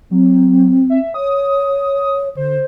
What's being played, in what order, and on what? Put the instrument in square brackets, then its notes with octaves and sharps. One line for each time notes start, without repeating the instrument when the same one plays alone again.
[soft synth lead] F#3 [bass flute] C4
[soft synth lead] E5
[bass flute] C#5 [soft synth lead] D#6
[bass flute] D3 [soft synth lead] C5